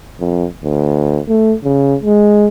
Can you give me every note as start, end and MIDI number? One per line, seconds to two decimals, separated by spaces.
0.20 0.46 41
0.63 1.20 38
1.28 1.55 57
1.64 1.96 49
2.03 2.48 56